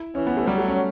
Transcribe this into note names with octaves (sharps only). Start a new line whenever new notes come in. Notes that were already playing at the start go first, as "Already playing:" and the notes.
Already playing: E4
E3 C#4
B3
A3
F#3 G3
A3
C#4